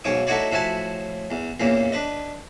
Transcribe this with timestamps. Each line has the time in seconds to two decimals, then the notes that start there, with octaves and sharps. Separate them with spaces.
0.04 B1 G#2 C#5 D6 D#6
0.27 A3 D#4 E4 F#4 C#5 D5
0.51 A2 F3 F#4 E5 G#5 A5
1.31 E2
1.60 E2 A#2 C#3 A#3
1.92 D4 B4 D#5